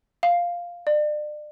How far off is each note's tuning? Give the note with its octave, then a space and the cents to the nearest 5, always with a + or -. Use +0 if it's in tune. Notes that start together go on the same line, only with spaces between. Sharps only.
F5 +0
D5 +35